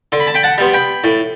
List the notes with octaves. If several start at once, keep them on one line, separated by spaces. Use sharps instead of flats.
D3 C6
B5
A5
G5 B5
F#5 A5
G3 B3 C6
G5 B5
A2